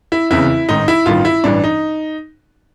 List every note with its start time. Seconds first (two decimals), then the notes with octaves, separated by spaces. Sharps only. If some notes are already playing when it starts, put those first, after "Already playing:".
0.12 E4
0.31 F1 E2 C#3 E4
0.69 A1 G#2 D#3 D#4
0.88 E4
1.06 A1 G2 D#3 F4
1.25 E4
1.44 A1 G2 E3 D4
1.64 D#4